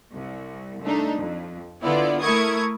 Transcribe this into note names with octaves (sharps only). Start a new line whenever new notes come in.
C2
A3 D4 D#4
F2
D3 B3 E4 F4 D5
A3 E4 A#4 C#6 D#6 G#6